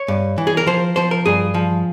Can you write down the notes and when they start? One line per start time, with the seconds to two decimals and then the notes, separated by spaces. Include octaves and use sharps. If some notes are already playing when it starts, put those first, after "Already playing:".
Already playing: C#5
0.08 G2
0.38 E3
0.47 G#4
0.57 A#4
0.67 F3 C5
0.96 F3 C5
1.11 A#4
1.26 G2 G#4
1.54 F3